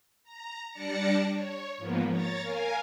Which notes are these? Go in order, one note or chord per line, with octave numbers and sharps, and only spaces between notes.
A#5
G3 D4 D5 A5 A#6 C#7
C#5
G#2 F3 A#3 B3
C#5 A#5 A6
A#4 F5 G#5